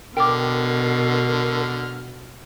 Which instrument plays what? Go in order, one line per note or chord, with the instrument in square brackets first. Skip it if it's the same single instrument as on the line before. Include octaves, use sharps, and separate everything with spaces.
[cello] B2 [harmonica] D3 F6 [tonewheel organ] A#4 [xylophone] G5 D6